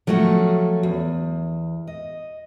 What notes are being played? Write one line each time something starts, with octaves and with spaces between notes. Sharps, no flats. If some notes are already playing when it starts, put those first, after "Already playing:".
F3 F#3 A3 C#4 F#4
E2
D#5